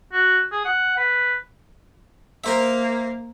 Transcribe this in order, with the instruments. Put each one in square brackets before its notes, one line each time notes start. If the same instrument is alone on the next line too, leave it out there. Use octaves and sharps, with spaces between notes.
[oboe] F#4
G#4
F#5
B4
[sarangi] A#3 [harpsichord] A#4 C5 E5